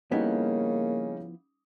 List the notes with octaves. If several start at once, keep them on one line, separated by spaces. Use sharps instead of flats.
C#3 F3 G3 A#3 B3 C#4 D#4 E4